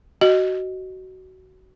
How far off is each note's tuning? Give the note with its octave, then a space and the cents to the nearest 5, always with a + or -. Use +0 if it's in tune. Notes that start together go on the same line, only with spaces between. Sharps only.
F#4 +20 D#5 +0